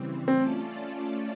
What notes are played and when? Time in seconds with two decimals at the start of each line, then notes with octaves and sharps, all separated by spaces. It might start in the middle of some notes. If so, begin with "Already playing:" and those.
Already playing: C#3 E3 G3 C4
0.27 A3 C4 C#4 F4 A4 D5